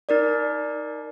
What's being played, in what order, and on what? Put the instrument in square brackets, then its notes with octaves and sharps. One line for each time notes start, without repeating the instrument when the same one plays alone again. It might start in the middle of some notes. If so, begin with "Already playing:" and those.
[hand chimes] D#4 A#4 D5